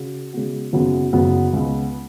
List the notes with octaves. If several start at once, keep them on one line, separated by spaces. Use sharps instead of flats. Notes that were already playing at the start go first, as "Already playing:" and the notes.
Already playing: C#3 F#4
C#3 G#3 B3 F#4
F#1 F#2 C#3 F#3 B3
F#1 F#2 C#3 F#3 B3
C#2 C#3 B3